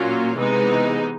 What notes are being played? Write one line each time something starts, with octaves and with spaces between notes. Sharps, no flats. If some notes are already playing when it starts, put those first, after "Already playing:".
Already playing: A#2 F#3 A#3 C#4 F4
C3 E3 G#3 B3 D#4